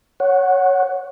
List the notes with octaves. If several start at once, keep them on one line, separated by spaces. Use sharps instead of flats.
C#5 F#5